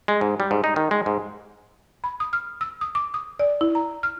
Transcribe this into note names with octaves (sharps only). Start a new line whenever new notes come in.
G#3
G#2
G3
G#2
D#4
D#3
G#3
G#2
B5
D#6
F6
E6
D#6
D6
D#6
D5
E4
A#5
F6